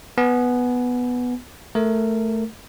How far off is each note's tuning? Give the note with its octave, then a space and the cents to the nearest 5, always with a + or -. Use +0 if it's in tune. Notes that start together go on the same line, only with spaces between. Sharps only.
B3 +0 G#5 +25
A3 +0 A#4 -10